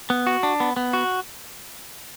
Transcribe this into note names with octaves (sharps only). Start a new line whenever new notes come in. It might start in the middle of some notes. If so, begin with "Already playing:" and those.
B3
F#4
D4
B3
B3
F#4